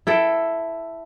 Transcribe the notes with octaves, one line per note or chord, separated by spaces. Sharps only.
E4 A4 G5